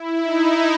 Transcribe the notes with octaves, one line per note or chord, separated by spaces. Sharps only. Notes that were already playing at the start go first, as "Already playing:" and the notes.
Already playing: E4
D#4